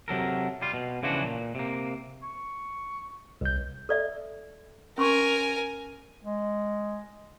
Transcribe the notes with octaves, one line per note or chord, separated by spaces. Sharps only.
C3 F#3 A4 A#4
G3 F4
B2
C#3 E3 F3 D4 F#4
A#2
C3 A#3
C#6
C2 G6
A4 D5 E5
C#4 A#4 G#5 C6 C#6
G#3